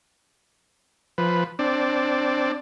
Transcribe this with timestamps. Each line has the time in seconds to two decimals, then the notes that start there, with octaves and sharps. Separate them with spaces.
1.18 F3 B4
1.59 C4 D4 D5